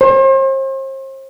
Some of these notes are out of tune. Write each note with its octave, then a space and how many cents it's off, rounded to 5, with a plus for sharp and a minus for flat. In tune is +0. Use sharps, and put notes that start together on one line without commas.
C5 +40